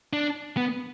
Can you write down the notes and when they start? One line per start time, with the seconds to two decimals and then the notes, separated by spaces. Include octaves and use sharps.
0.13 D4
0.57 B3